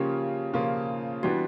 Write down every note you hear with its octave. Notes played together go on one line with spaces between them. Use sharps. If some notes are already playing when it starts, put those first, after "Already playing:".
Already playing: C#3 F3 A#3 C#4 F4 G4
C#3 F3 A#3 C#4 F4
E3 G3 B3 D4 F#4